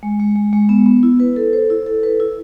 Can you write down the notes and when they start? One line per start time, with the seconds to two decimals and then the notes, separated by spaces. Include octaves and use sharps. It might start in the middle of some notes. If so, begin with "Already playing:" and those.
0.03 G#3
0.20 G#3
0.36 G#3
0.53 G#3
0.69 B3
0.86 B3
1.03 E4
1.20 B4
1.36 A4
1.53 C5
1.70 E4
1.87 A4
2.03 B4
2.20 E4